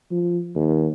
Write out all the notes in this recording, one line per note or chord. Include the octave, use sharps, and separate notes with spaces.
F3
D#2